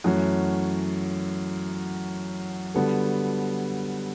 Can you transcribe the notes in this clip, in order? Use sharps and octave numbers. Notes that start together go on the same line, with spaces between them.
F#2 E3 A3 C#4 F#4
D3 G3 B3 F#4 A4